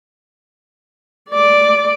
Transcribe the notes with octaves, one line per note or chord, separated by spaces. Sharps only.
D5 D6